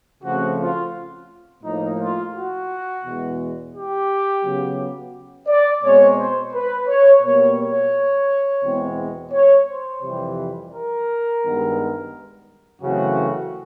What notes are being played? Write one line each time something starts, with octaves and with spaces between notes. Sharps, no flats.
C#3 F3 A3 C4 F#4
F4
A2 F3 A#3 D#4
F4
F#4
E2 B2 G#3
G4
C#3 F#3 B3
D5
B2 G#3 C4 C#5
C5
B4
C#5
B2 G3 A#3 C#5
C#5
E2 B2 G#3 C4
C#5
C5
F2 C3 E3 G3
A#4
G2 D#3 G#3 B3
F#2 C#3 E3 A3 C4 F#4